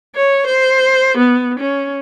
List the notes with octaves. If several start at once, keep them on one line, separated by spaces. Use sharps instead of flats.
C#5
C5
B3
C#4